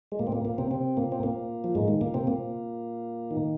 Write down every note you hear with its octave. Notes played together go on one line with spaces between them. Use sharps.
G#3
A#2 A#3
C4
A#2 A#3
A#2 A#3
C3 C4
C3 C4
A#2 A#3
C4
A#2 A#3
F3
G#2 G#3
D#3
A#2 A#3
C3 C4
A#2 A#3
D#3